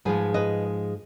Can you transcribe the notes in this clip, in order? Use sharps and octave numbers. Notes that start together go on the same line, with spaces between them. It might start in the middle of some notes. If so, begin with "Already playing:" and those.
G#2 F3 G#3 G#4 B4
B4 D#5